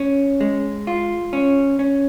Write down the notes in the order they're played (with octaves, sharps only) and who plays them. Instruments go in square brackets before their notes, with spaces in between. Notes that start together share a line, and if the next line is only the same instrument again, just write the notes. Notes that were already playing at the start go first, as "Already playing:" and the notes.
Already playing: [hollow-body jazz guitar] C#4
G#3
F4
C#4
C#4